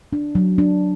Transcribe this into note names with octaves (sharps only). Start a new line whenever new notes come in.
D4
F#3
D4